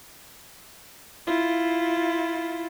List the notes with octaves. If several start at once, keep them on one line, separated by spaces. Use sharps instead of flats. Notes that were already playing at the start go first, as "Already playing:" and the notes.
E4 F4